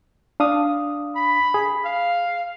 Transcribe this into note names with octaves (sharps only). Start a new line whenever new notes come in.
D4 F5 D#6
B5
G#4
F5